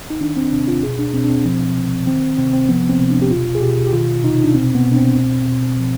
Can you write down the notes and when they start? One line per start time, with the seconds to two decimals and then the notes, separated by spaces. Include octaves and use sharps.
0.10 D#4
0.21 D#3 D4
0.37 C4
0.52 C3 D4
0.68 F4
0.83 B2 G#4
0.99 D4
1.14 B2 C4
1.25 D4
1.30 C4
1.45 F3
1.76 C3
2.07 D#3 C4
2.38 C3 C4
2.53 C4
2.69 F3 B3
2.89 C4
3.00 C3
3.10 D4
3.22 G4
3.31 B2 F4
3.55 G#4
3.62 B2 G4
3.87 G4
3.93 D#3 F4
4.24 C3 D#4
4.44 D4
4.54 B2 C4
4.75 B3
4.85 B2
4.92 D4
4.96 C4
5.17 B2
5.48 B2
5.79 F3